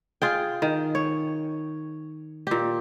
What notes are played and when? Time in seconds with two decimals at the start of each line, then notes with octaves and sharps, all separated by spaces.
0.22 F4 G#4 G5
0.62 D#3
0.95 C#5
2.47 A#2 G4